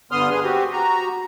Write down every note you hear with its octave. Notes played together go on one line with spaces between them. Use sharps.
G2 D3 B3 C6 D#6 F6
G#4 B4
C4 F#4 G4
F#4 A#5